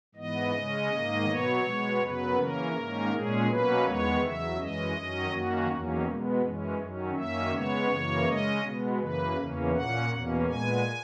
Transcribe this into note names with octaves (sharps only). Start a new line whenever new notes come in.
G#2 E3 B3 D#5
C#3 G#3 C#4
G#2 D#3 A#3
B2 F#3 B3 C#5
B2 G#3 B3
F#2 C#3 F#3 B3 B4
C#3 E3 A#3 C#4 A#4
G#2 D#3 A#3 C#4
A#2 G#3 C#4 G#4
B2 F#3 A#3 C#4 B4
E2 D#3 G#3 B3 C#5
E2 C#3 F#3 E5
F#2 E3 G#3 C#4 D#5
F#2 D#3 F#3 C#4
F#2 D#3 A#3 C#4 F#4
E2 D#3 F#3 A#3 C#4
B2 G#3 B3
F#2 E3 G#3 C#4
F#2 D#3 F#3 C#4
F#2 D#3 A#3 C#4 E5
C#3 G#3 B3 C#5
F#2 C#3 E3 A#3
C#3 G#3 C#4 D#5
B2 G#3 B3
F#2 C#3 E3 A#3 B4
E2 C#3 E3 A#3 C#4
A#2 A#3 C#4 F#5
E2 B2 A#3 C#4
A#2 G#3 B3 G#5